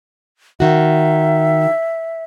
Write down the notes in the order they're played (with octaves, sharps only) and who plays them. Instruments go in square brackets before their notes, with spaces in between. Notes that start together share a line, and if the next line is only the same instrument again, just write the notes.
[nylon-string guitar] D#3 F#4 [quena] E5